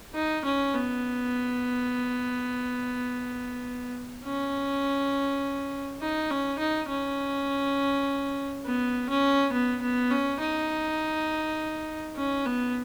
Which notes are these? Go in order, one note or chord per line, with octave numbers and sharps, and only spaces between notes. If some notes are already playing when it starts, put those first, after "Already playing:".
D#4
C#4
B3
C#4
D#4
C#4
D#4
C#4
B3
C#4
B3
B3
C#4
D#4
C#4
B3